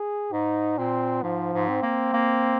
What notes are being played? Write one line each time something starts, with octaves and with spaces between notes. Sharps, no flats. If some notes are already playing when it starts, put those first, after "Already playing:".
Already playing: G#4
G#2 D#4
A#2 C4
G#2 F3
G#2
C4
A#3
A#3